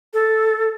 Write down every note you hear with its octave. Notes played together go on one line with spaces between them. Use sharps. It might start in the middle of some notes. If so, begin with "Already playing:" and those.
A4